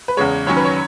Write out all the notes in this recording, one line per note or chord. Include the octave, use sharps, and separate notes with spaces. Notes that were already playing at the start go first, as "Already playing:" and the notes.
B4
E2 C#3 G#3 C#5
F#2 D#3 F#3 C#4 C#5
B4
C#5